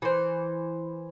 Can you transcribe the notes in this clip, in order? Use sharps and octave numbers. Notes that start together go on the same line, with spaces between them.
E3 C5